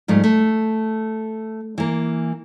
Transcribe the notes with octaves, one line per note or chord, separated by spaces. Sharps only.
G#2 F3 G3 A3
A3
E3 A#3